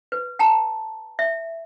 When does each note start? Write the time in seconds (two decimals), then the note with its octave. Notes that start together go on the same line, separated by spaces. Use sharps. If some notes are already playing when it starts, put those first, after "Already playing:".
0.12 B4
0.39 G5 A5 A#5
1.19 E5